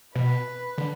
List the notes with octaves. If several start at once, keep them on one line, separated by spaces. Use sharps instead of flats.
B2 B4
D3